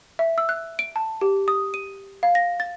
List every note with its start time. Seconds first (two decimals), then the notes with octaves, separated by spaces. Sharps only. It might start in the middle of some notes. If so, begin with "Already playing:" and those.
0.19 E5
0.38 E6
0.49 F#6
0.79 D7
0.96 A5
1.21 G4
1.48 D#6
1.74 D#7
2.23 F5
2.35 A#6
2.60 A6